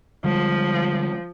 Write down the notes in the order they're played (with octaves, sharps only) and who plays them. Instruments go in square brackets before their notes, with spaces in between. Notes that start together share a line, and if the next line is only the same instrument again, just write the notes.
[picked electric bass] D3 G3 G#3 [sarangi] F3